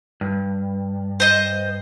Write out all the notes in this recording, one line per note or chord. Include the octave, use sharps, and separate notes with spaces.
G2
C5 D#5